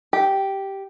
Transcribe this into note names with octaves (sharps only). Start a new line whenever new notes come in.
G4